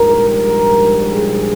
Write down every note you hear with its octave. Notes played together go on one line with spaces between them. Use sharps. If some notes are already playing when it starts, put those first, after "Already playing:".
Already playing: A#1 G#2 G3 A#4
G#4